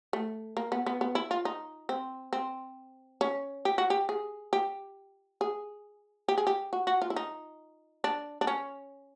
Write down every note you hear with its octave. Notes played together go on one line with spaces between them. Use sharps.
A3
A#3
B3
B3
B3
E4
F4
D#4
C4
C4
C#4
G4
F#4
G4
G#4
G4
G#4
G4
G#4
G4
F#4
F#4
F4
E4
D#4
D4
D4
C#4